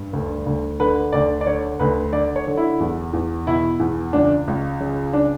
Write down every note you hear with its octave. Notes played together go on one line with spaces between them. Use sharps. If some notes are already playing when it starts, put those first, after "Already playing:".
Already playing: G2
D2
D2
D3 B4
D2 D5
D5
D3 C#5
D2 B4
D3 D5
C#5
D3
E4
E2
E2
B2 E4
E2
C#2 D4
C#2
C#3
D4